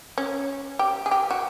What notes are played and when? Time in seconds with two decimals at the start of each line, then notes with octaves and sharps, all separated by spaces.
0.18 C#4
0.79 G4
1.06 G#4
1.11 G4
1.31 F#4